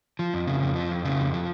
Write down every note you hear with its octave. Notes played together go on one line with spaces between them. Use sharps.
F3
F2
C#3
F2
F3
F2
C#3
F2
F3